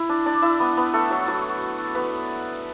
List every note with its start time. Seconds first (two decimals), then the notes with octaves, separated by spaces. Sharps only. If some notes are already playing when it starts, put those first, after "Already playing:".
Already playing: E4
0.09 D4
0.26 D4 D5
0.42 E4 E5
0.60 B3 B4
0.77 B3 B4
0.93 A3 A4
1.10 F#3 F#4
1.28 F#3 F#4
1.95 B3 B4